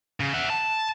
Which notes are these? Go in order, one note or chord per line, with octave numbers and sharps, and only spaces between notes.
C#3
E5 F#5
A5